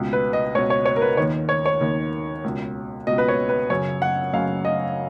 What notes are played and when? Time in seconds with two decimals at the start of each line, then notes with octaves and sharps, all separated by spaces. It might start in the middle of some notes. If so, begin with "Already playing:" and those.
Already playing: C#2 B2
0.13 B4
0.33 D#5
0.55 C#2 C#5
0.58 B2
0.70 C#5
0.86 C#5
0.96 A#4
1.02 B4
1.17 D#2 D#3 C#5
1.49 C#5
1.66 C#5
1.81 D#2 D#3
2.44 C#2 B2
3.07 C#2 B2 D#5
3.18 B4
3.28 C#5
3.49 B4
3.70 F#2 C#3 C#5
4.02 F#5
4.33 F#2 C#3 F5
4.65 D#5